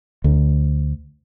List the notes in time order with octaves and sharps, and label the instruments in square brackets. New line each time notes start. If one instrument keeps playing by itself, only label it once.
[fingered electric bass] D2